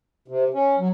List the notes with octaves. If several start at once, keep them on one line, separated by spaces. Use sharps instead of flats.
C3
C#4
F#3